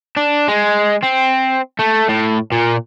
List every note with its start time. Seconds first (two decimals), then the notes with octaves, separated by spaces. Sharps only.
0.17 D4
0.48 G#3
1.03 C4
1.79 A3
2.09 A2
2.52 A#2